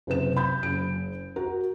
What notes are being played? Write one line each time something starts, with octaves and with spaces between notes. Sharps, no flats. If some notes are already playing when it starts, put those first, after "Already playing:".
F#1 C3 B4 E7
B5 G6
F#1 D7
F#4 A#4